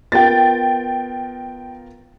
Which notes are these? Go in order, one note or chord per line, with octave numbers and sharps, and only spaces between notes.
B3 F4 A#4 G5 A6